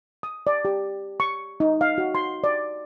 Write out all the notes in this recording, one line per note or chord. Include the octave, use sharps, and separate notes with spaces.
D#6
D5
G4
C#6
D#4
F5
F#4
C6
D5